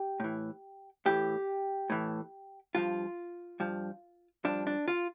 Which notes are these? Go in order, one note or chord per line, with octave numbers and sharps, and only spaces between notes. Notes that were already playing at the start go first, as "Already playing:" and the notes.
Already playing: G4
A2 E3
A2 E3 G4
A2 E3
G2 F3 F4
G2 F3
G2 F3 D4
D4
F4